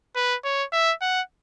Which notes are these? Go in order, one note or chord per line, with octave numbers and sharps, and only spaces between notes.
B4
C#5
E5
F#5